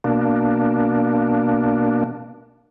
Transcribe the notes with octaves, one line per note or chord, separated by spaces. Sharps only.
B2 A#3 D4